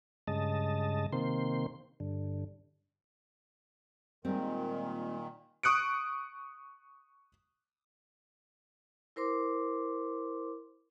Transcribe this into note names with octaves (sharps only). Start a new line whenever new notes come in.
G2 C#3 G#3 D#5 A5
C3 D#3 A#3 C4 C6
G2 D3
A#2 D#3 G3 G#3 C4
C#6 D#6 F#6 C#7 D7
E4 A#4 C5 C6 D6